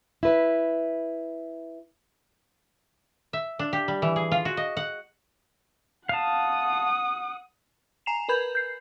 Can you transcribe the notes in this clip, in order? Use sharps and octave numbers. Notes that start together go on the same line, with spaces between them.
E4 B4
E5
D4
G4
G3
E3
G#4
F4
F#4
D#5
F#5
F5 F#5 A5 D#6
G#5 A#5 C7 E7 F7
A#4 B4 B5 G6 G#6
G6 C7